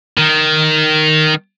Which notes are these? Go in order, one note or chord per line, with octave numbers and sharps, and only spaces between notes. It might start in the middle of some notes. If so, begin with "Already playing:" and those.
D#3